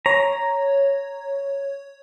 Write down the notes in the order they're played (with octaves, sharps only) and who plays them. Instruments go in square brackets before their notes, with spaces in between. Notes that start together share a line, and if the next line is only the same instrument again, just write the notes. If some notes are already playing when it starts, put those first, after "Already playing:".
[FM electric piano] C#5 [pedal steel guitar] A#5